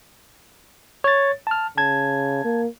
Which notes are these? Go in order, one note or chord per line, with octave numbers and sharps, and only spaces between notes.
C#5 A6
A5 F6
C#3 A5 G#6
A#3